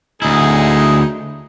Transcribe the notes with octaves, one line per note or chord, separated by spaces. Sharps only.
D2 G#3 D#4 E4 G#4